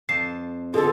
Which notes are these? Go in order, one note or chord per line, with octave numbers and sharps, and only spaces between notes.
F2 A5 C7
B2 D3 F4 G#4 A4